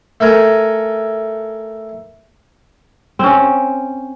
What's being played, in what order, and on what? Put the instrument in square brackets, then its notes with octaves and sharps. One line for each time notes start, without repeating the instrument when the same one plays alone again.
[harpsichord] A3 A4 A#4 G#5
[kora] C4 C#4